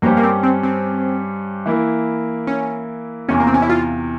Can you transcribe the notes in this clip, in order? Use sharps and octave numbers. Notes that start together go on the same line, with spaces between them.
G2 G3 A#3 C#4 G4 C5
A#3
C4
C4
C4
E3 A#3 E4
C#4
E2 C3 E3 C#4
A#3
C4
C#4
E4
F4